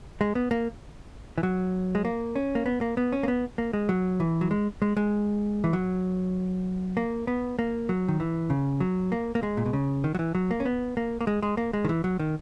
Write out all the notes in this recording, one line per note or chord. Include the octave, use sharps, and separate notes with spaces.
G#3
B3
A#3
E3
F#3
G#3
A#3
C#4
A#3
B3
A#3
B3
C#4
A#3
B3
A#3
G#3
F#3
E3
F#3
G#3
G#3
G#3
E3
F#3
A#3
B3
A#3
F#3
D#3
E3
C#3
F#3
A#3
A#3
G#3
A#2
B2
C#3
D#3
F#3
E3
F#3
A#3
C#4
B3
A#3
A#3
G#3
G#3
A#3
G#3
D#3
E3
F#3
D#3